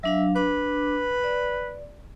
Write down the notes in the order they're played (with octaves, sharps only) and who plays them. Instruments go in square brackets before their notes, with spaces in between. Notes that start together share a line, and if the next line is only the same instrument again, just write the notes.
[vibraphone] F#3 D4 F5 [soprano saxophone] E5
[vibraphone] D4 D6 [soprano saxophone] B4
[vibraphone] D5